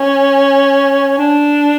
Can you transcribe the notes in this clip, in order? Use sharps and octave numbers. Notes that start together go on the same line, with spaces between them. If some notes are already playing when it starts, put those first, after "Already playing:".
Already playing: C#4
D4